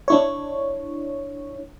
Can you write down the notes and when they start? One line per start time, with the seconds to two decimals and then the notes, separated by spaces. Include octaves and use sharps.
0.08 D4 E4 C#5